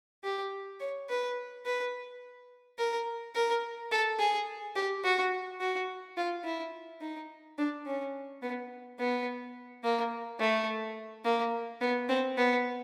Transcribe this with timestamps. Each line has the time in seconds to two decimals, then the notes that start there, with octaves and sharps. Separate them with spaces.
0.24 G4
0.80 C#5
1.09 B4
1.66 B4
2.78 A#4
3.35 A#4
3.91 A4
4.19 G#4
4.76 G4
5.04 F#4
5.61 F#4
6.17 F4
6.44 E4
7.01 D#4
7.58 D4
7.86 C#4
8.42 B3
8.99 B3
9.84 A#3
10.40 A3
11.25 A#3
11.81 B3
12.09 C4
12.37 B3